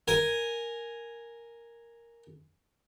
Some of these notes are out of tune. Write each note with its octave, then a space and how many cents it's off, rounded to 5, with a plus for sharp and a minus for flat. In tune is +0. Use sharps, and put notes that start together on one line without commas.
A#4 +0 G#5 +0